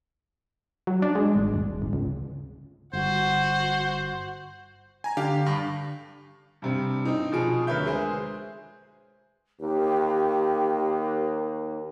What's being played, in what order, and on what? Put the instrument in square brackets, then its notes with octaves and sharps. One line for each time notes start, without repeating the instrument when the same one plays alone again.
[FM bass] F#3
D4
G#3
G#1
D#1
G#1
C#2
[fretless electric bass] G1 [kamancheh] F#4 F#5 [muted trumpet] C5
[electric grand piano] G#5 A#5
[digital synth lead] D3 [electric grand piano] G4 F5
[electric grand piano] G2
[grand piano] G2 C3 C4
C4 D#4
B2 F3 G#4 D7
D2 A#4 B4 C#5 E5 G6
G#3 G#4 C5
[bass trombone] D#2 [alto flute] G4